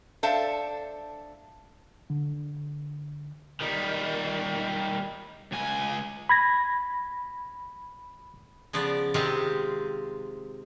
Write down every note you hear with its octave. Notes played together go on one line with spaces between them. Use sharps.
D4 A4 C5 E5 F5 A5
D3
D#3 G3
C#2 G#5
B5 G#6 A#6
C#3 F3 B3 D5
C3 D#3 G#3 C4 F4 G4